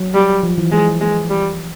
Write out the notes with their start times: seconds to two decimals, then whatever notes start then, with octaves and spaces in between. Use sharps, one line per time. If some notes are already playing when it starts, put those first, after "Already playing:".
Already playing: F#3
0.14 G3
0.43 F3
0.58 E3
0.72 E3 G#3
1.00 G#3
1.30 G3